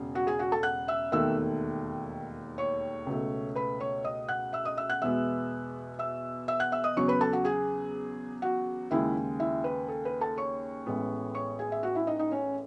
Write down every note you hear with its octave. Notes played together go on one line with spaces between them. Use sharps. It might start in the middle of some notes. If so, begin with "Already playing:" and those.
Already playing: E1 C#3
F#4 F#5
G#4 G#5
F#4 F#5
A4 A5
F#5 F#6
E5 E6
E1 D#2 D#3 A3 E5 E6
C#5 C#6
C#2 B2 A3
B4 B5
C#5 C#6
D#5 D#6
F#5 F#6
E5 E6
D#5 D#6
E5 E6
F#5 F#6
E2 B2 G#3 B3 E5 E6
E5 E6
E5 E6
F#5 F#6
E5 E6
D#5 D#6
E2 C#3 F#3 C#5 C#6
B4 B5
A4 A5
F#4 F#5
G#4 G#5
F#4 F#5
D#2 C#3 G#3 E4 E5
E4 E5
B4
A4
B4
A4 A5
C#5 C#6
A1 A2 G#3 B3
C#5 C#6
G#4 G#5
E5
F#4 F#5
E4 E5
D#4 D#5
D#4 D#5
C#4 C#5